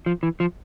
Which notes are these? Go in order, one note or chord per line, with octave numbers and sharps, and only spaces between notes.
F3
E3
F3